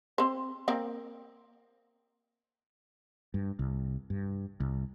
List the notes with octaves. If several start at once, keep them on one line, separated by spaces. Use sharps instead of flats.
C4 C5
A#3 C4 A#4
G2
C2
G2
C2